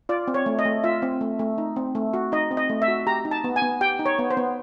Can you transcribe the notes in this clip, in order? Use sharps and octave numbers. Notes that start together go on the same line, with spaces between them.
F4 D5
C4
C#5
A3
D#5
A3
F4 E5
C4
A3
A3
D#4
C4
A3
F#4
D#4 D#5
C4
D#5
A3
E5
F#4
G4 A#5
D#4
A5
B3
G#5
B3
G4 G5
D#4
C#5
B3
C5
B3